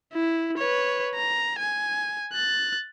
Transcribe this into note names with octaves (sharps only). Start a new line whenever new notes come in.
E4
B4 C#5
A#5
G#5
F#6 A6